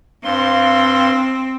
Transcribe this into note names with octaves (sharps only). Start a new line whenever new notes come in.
G2 C4 F5 C6